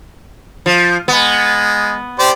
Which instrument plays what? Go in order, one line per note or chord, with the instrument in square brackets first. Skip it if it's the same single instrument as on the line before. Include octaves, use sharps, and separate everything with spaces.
[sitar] F3
[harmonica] G#3 [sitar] B3
[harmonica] G4 C5 D5